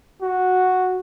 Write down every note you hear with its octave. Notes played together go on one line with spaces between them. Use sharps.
F#4